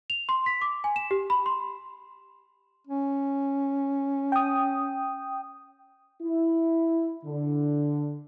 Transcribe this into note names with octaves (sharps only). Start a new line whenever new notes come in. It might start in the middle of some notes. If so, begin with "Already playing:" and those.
F7
C6
B6
D6
G#5
E7
G4
B5
C6
C#4
G5 D#6
E4
D3